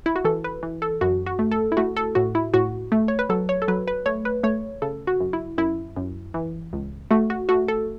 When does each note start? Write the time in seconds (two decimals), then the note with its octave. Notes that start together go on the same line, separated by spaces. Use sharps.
0.06 E4
0.16 F#4
0.24 E3 A4
0.44 B4
0.63 E3
0.82 A4
1.01 F#2 F#4
1.26 F#4
1.39 A3
1.51 A4
1.72 E4
1.77 A3 F#4
1.97 A4
2.15 A2 F#4
2.35 E4
2.54 A2 F#4
2.92 A3
3.08 C#5
3.19 B4
3.29 F#3 A4
3.49 C#5
3.62 A4
3.68 F#3 B4
3.88 B4
4.06 A3 C#5
4.25 B4
4.43 A3 C#5
4.82 C#3 A4
5.07 F#4
5.20 F#2
5.33 E4
5.58 F#2 E4
5.97 F#2
6.34 E3
6.73 C#2
7.11 A3 F#4
7.30 F#4
7.49 A3 F#4
7.68 A4